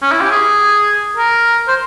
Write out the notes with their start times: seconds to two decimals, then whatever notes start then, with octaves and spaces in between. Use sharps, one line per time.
0.02 C#4
0.12 E4
0.21 G4
0.31 G#4
1.17 A#4
1.68 C5